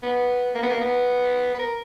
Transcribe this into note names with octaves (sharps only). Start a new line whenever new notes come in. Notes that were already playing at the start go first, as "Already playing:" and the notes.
B3
A#3
B3
A#3
B3
B4
A#4